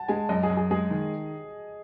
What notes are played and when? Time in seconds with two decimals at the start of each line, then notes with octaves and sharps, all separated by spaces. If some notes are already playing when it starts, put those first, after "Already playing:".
Already playing: F#5 A5
0.08 G#3 G#5
0.29 F#2 D#5
0.43 G#4
0.50 F#2
0.57 G#4
0.71 G#3 G#4
0.90 D#3